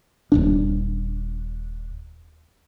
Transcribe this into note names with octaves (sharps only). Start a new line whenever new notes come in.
D#1 G#1 D4